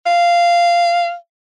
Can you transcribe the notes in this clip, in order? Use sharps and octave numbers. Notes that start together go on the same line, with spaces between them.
F5